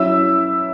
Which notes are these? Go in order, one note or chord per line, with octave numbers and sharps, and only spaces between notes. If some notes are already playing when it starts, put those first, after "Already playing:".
Already playing: F#3 C#4 E4 E5 E6